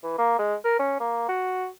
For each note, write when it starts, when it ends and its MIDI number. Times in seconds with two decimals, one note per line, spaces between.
0.03 0.14 52
0.18 0.34 58
0.39 0.55 56
0.64 0.77 70
0.79 0.97 61
1.00 1.28 58
1.29 1.68 66